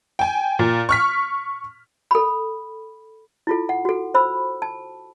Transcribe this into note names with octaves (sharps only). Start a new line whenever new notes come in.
G5 G#5
A#2
C#6 F6 B6
A4 B5
E4 F4 A4
F#5
F#4 A4
C5 B5 E6
A5